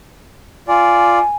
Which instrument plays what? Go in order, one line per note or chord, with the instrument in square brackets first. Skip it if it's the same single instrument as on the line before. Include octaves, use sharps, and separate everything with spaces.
[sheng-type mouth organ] F4 D5 [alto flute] G#5